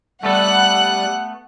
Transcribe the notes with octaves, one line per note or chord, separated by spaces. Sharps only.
G3 A3 B3 A4 F#5 F#6